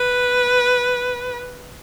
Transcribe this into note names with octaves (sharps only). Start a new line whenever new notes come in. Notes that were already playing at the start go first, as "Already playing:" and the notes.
Already playing: B4